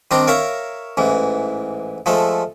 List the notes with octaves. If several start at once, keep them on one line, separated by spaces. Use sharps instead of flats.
D#3 G3 C4 D4 A#5 C6
A#4 C#5 E5 F5 A#5
A1 G#2 E3
F3 G#3 A3 A4